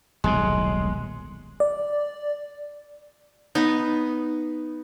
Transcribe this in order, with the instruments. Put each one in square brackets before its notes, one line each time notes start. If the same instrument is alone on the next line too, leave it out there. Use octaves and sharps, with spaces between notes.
[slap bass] D#1 B1 A2 [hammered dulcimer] G#3
[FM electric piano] D5
[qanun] B3 D#4